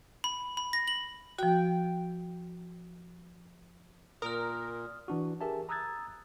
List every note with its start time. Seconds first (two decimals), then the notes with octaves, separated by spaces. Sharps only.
0.24 B5
0.57 B5
0.73 A#6
0.88 F#7
1.38 F3 F#4 G5
4.22 A#2 A#4 D#6 F6
5.08 E3 D4 F#4
5.41 G4 G#4 A#4 E5 G#5 A5
5.69 A#5 D#6 E6 F#6 G#6 A6